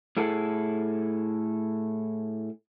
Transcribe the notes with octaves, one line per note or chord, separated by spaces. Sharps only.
A2 E4 G#4 A4